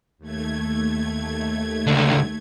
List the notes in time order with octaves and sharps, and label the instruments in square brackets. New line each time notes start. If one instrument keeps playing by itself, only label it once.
[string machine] D#2 A3 G#6
[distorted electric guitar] C#2 D3